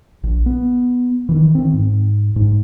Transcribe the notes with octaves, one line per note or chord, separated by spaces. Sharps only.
A#1
B3
D#3 E3
D#3 C4
G#2
G#2